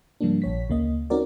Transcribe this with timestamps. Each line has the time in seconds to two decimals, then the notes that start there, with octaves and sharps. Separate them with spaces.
0.21 G#2 C#3 F3 G3 A#3 D4
0.42 A#1 C#5 B6
0.69 D2 C#3 A#3 D#5
1.10 C4 C#4 D#4 F#4 A#4 D5